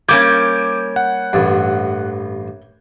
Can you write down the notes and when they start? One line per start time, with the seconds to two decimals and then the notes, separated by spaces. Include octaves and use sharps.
0.09 G3 A#3 C#4 D6 G6 G#6
0.96 F#5
1.33 A1 G2